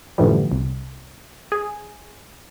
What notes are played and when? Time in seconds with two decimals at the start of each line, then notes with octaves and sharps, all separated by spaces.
0.18 F#2 A2 D3 E3 F3 G3
0.52 C2
1.52 G#4